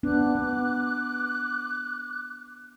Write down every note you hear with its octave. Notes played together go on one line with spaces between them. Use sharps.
B3 D4 D6 F#6
B3